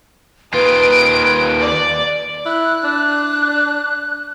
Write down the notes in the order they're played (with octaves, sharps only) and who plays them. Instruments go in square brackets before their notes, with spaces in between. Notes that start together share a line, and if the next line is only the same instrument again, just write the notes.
[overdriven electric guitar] D#2 F4 [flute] B4 [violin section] D#6 D7
[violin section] D5
[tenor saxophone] E4 [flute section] F#6
[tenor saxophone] D4